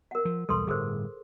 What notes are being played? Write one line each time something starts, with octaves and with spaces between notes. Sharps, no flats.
A#4 F#5
F3
B1 E2 G3 A4 B4 C6
G1 A2 G#4 A#4 C5